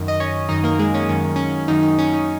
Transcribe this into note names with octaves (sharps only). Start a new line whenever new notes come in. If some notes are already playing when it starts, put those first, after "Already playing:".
Already playing: F#2 D#3
D#5
C#4 C#5
F#2 D#3 D#4 D#5
A#3 A#4
G#3 G#4
C#4
F#2 D#3 C#4
C#4
F#2 D#3 D#4
D#4
C#4
D#4